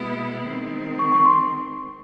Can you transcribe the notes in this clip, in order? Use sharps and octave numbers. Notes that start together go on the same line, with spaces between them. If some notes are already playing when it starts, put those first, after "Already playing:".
Already playing: B2 G#3 B3 E4
D#3 G#3 C4
C#6
C#6
C6